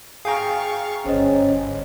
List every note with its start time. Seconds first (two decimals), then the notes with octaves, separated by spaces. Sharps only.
0.25 G#4 F5 G5 A#5 C#6
1.06 G1 C#4 C5 D#5